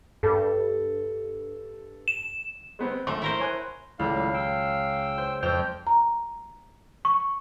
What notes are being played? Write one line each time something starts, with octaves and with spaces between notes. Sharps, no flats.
G2 A4
E7
G#3 B3 C4
A#1 A3 C6
E4 A#4 C5
C#5 G#5 F#6
C#2 A2 G3 F5
G5 E6
C5
F2 C5 G5 F6
A#5
C#6